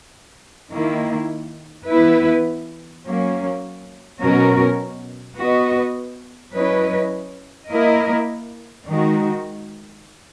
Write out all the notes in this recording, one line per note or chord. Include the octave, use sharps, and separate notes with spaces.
D#3 A#3 E4
E3 B3 E4 B4
F#3 A#3 C#4
B2 F#3 C#4 F#4 A#4
B3 F#4 B4 D#5
F#3 C#4 E4 B4 D#5
A#3 E4 A#4 D#5
D#3 G#3 D#4 F#4